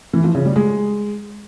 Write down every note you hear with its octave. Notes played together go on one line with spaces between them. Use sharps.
E3
F3
C#3
G3
G#3